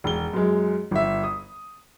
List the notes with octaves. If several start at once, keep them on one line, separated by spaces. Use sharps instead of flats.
E1 G7
F#2 G#3
G1 E5
D#6